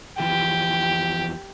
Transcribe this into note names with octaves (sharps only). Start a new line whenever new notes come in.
E2 E3 F3 G4